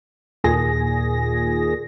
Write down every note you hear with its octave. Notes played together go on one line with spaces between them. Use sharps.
D#2 A#2 G#4 A#6